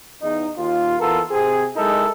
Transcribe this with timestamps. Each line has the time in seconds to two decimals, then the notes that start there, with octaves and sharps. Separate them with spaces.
0.21 E2 D#4
0.58 D#2 F4
0.99 E3 B3 F4 A4 A#4
1.31 C3 C4 G#4
1.76 G#3 D#4 E4 A4 A#4